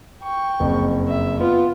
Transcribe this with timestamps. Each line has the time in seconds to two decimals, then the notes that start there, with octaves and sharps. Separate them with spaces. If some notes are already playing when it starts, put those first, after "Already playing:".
0.23 G5 C#6
0.60 F#1 F2
1.08 E5
1.41 B3 F4